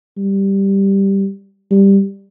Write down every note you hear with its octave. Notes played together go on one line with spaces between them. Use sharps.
G3
G3